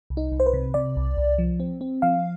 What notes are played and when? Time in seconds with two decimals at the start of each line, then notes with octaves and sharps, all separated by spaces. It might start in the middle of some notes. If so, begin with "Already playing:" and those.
0.10 C2
0.17 D#4
0.32 C2
0.40 C5
0.46 B4
0.53 C3
0.74 C3 D5
0.96 C2
1.17 C2
1.38 F3
1.60 C4
1.81 C4
2.02 F3 F5